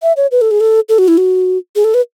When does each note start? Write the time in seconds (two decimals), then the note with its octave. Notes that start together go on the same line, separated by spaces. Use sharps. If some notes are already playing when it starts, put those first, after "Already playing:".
0.03 E5
0.17 C#5
0.31 B4
0.41 A4
0.51 G#4
0.60 A4
0.89 A4
0.98 F#4
1.08 E4
1.18 F#4
1.76 G#4
1.84 A4
1.94 B4